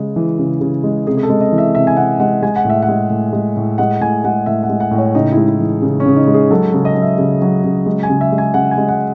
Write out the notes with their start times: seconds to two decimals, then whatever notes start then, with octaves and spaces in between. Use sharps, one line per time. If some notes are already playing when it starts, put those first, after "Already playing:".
Already playing: C#3 G#3 G#4
0.16 E3
0.39 C#3
0.61 C#3
0.84 G#3
1.07 C3 G#4
1.17 G#4
1.23 A4
1.30 G#3
1.41 D#5
1.52 E3
1.58 E5
1.75 C3 E5
1.87 G#5
1.97 C3 F#5
2.20 G#3 F#5
2.43 G#3 G#5
2.56 F#5
2.65 A2 E5
2.82 F#5
2.89 G#3
3.10 A2
3.33 G#3
3.57 A2
3.78 G#3 F#5
4.01 A2 G#5
4.24 G#3 F#5
4.46 A2 E5
4.63 F#5
4.70 G#3
4.80 F#5
4.91 A2
4.98 C#5
5.15 C#3 D#4
5.32 E4
5.37 G#3
5.48 E4
5.59 E3
5.82 C#3
6.00 C#4
6.06 C#3
6.16 D#4
6.28 G#3
6.34 G#4
6.51 F#3 A4
6.74 C#3
6.85 D#5
6.95 F#3
7.02 E5
7.18 C#3
7.42 F#3
7.64 C#3
7.86 G#3
8.03 G#5
8.09 C#3
8.21 E5
8.32 G#3
8.38 G#5
8.54 C#3 F#5
8.71 G#5
8.78 G#3
8.89 F#5